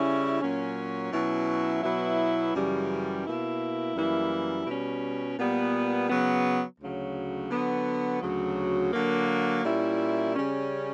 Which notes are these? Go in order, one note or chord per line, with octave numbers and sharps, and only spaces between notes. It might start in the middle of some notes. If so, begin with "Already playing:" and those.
Already playing: C#3 G3 C#4 E4
A#2 F#3 C#4
B2 F#3 C#4 E4
B2 F#3 B3 E4
F#2 C#3 E3 G3
B2 A#3 E4
F#2 E3 G3 A#3 E4
B2 G3 C#4
A#2 G3 B3
C#3 F#3 B3
D2 C#3 F#3
D3 F#3 B3
D2 C#3 F#3
D3 F#3 A#3
A#2 G3 C#4 E4
C#3 G3 C#4